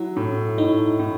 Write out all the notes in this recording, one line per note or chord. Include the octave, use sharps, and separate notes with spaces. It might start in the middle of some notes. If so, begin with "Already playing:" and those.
Already playing: F#3 E4
A2
A2 D#4
A2